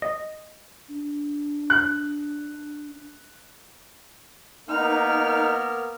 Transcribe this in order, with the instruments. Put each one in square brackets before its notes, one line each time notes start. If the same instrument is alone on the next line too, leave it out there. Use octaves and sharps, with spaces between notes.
[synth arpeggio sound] D#5
[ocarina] D4
[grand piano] F#6
[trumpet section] A#3 B3 A#4 [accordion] D#4 [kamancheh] F6